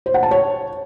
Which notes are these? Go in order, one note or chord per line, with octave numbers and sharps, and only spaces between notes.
C5
F#5
A5
C#5